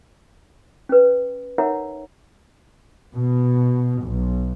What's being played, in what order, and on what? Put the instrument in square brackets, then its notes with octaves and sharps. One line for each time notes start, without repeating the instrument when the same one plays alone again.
[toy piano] C#4 B4
D#4 A#4 C#5 E5 F#5 A#5
[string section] B2
B1